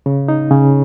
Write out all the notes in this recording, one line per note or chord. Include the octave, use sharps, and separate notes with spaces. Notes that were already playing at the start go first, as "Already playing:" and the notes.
C#3
D#4
C#3